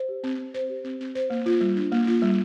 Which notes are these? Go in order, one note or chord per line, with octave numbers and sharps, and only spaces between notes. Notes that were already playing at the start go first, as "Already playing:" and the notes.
Already playing: C5
G4
C4
C4
C5
G4
C4
C4
C5
A#3
F4
G3
D4
A#3
F4
G3